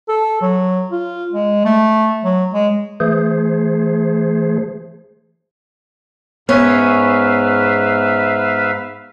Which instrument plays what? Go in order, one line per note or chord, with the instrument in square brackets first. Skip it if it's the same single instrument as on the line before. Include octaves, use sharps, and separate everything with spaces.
[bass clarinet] A4
F#3
F4
G#3
A3
F#3
G#3
[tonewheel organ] E3 A3 G#4 C5
[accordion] G#2 F6 [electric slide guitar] B3 C#5 [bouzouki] C#4 [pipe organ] B4 E5 F5